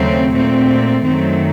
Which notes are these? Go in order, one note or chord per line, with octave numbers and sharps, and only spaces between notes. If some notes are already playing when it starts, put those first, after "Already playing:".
Already playing: D#2 C#3 F#3 A3 C4
A#2 A3 C4
F#2 D#3 F#3 A3 C4